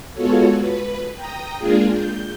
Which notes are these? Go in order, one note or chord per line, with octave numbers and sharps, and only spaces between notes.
G#3 B3 F4 F#4 A4 C#5
B4
G5 A#5 D#6
G#3 A#3 D4 F4 G#4
G6